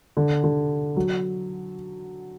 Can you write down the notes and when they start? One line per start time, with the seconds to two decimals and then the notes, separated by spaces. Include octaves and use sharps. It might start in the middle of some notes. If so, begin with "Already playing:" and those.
0.17 D3
0.44 D3
0.97 F#3